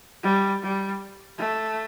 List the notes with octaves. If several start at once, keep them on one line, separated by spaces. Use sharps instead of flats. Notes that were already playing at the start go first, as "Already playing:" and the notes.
G3
G3
A3